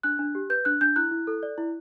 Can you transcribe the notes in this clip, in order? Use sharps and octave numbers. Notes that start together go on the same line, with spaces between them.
D4 F#6
D4
G4
B4 G6
D4 F#6
D4 G6
E4 F#6
E4
A4
D5
E4